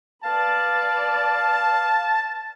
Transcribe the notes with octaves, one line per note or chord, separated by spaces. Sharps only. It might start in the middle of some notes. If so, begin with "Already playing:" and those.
B4 D5 F5 A5